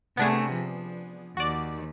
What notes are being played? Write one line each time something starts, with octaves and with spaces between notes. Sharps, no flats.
C3 A3 B3 D4 G#4
F3
D#2 F#4 D5